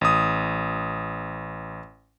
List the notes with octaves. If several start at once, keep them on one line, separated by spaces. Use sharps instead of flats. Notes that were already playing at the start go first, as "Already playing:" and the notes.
A1 D#6